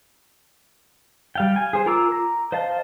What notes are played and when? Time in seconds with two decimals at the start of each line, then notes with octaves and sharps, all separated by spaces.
1.35 G3 F5 G5
1.56 G#5
1.73 G#4 C5
1.86 F4 A#4 A#5 D6 E6
2.12 A#5
2.52 C5 D#5 F5 A5